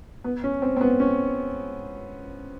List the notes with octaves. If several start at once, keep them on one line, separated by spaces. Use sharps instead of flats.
B3
C#4
C4
C4
B3
C#4